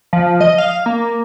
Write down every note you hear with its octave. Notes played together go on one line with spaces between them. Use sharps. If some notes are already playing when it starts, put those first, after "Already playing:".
F3
D#5
F5
A#3